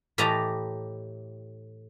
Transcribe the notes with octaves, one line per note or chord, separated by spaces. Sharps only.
A2 E3 G4 D#5 A5 A#5